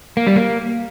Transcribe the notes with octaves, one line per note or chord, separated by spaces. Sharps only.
A#3
G3
A#3